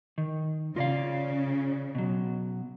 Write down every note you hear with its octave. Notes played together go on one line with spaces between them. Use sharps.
D#3
C#3 F4 D5 F5
B2 F#3